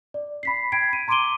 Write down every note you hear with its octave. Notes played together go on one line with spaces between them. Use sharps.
D5
B5 B6 C7
G5 B5 G#6 B6 C7 D7
D#7
A#5 C6 D6 D7 D#7 G7